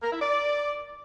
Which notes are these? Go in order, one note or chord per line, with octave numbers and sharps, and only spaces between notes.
A#4
E4
D5